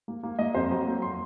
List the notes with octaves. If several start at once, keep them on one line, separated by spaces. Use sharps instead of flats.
A#3
A#3
A#3 D#5
F2 C5
F#3 A#5
A#3
C6